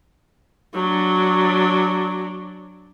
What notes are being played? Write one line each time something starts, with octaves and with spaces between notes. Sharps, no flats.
F#3 D4